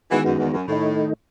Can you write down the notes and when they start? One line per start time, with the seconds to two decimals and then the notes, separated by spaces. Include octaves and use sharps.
0.10 D#3 E3 G#3 B3 F#4
0.26 F#2
0.39 E2
0.53 F#2
0.67 A2 D#3 A3 D#4